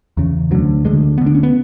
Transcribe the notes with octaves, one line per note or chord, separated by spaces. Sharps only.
E2 C#3
D2 D3 F#3
D2 D3 G#3
D2 D3 B3
D4
C#4
B3